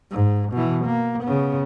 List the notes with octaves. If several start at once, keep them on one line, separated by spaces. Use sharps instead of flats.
G#2
B2 E3
A#3
C#3 B3